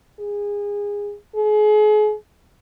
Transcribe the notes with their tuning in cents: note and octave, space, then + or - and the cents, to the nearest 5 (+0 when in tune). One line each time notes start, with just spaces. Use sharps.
G#4 -20
G#4 +35